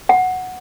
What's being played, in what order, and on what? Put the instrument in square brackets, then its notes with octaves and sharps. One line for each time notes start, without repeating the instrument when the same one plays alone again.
[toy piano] F#5